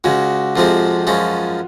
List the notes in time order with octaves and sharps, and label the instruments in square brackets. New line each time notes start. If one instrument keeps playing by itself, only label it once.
[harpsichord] C#2 C#3 G#3 [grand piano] F#4
[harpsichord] F2 C3 F3 G#3 C4 [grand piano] F4
[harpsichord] F#2 F3 G#3 C#4